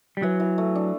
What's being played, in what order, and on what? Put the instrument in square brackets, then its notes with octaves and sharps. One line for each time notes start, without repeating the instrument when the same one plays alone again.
[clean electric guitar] G3
[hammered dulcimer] E3 [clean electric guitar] F#3
[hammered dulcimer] E3
A3
D4